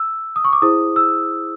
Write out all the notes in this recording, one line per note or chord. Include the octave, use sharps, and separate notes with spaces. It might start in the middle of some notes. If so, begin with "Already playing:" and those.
Already playing: E6
D#6
C#6
D6
E4 G#4 C5 D#6
E6